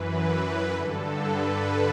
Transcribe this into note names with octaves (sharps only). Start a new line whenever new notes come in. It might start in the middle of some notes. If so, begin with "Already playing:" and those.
Already playing: F#2 E3 B4
B4
G2 D3 A4
B4